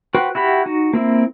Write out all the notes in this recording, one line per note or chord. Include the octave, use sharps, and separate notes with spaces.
F#4 B4 C5 G5
E4 F#4 G4 B5
D#4 F#4
A#3 C4 E4